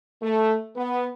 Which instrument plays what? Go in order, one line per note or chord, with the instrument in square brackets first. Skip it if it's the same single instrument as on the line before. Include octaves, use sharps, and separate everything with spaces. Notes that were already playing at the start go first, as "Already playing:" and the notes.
[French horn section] A3
B3